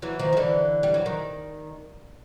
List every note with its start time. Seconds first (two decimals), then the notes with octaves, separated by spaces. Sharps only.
0.02 E3 F#3
0.19 D#3 F3
0.33 F3
0.37 D3 E3
0.83 G3
0.94 F#3
1.06 D#3